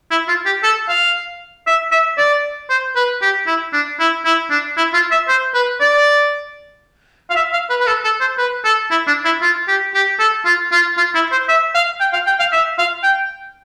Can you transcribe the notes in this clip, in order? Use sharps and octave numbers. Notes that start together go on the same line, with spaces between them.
E4
F4
G4
A4
F5
E5
E5
D5
C5
B4
G4
E4
D4
E4
E4
D4
E4
F4
E5
C5
B4
D5
F5
E5
F5
B4
B4
A4
A4
C5
B4
A4
E4
D4
E4
F4
G4
G4
A4
F4
F4
F4
E4
C5
E5
F5
G5
F5
G5
F5
E5
F5
G5